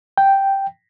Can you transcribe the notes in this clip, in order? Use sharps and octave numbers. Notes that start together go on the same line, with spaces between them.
G5